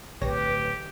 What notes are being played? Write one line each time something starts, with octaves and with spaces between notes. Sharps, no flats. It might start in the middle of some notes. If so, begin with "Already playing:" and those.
D1 B1 G4 B4 C#5 A#6